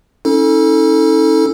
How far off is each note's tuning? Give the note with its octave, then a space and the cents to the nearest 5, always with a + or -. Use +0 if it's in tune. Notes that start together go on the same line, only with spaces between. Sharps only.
C#4 +0 E4 -45 A4 +0